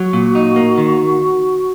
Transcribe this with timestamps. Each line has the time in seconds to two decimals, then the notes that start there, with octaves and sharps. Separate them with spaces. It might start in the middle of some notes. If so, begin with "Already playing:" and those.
Already playing: F#3 F#4
0.13 A#2
0.35 D#4
0.56 A#3
0.78 D#3